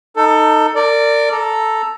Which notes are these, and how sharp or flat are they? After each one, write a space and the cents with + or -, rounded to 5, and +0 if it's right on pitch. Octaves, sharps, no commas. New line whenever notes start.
D#4 +0 A4 +20
A#4 -30 D5 +0
A4 +0 A#5 +0